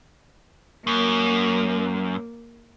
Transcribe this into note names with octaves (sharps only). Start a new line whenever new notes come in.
F#2 A#3